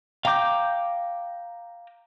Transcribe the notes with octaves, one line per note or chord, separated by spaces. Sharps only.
F5 G5 A#5 D6 G6